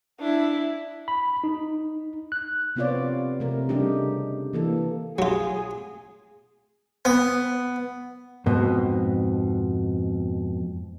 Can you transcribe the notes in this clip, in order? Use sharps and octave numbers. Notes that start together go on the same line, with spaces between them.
D4 E4
B5
D#4
F#6
C3 B3 C4 F4 C#5 D5
C3 A3 A#4
C#3 G3 D4 D#4 G4
E3 A#3 A4
F#3 F4 G#4
B3
F2 G#2 B2